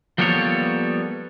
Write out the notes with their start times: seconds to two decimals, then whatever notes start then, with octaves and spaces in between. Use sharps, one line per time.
0.18 F3 G3 A#3 B3 A4 C#5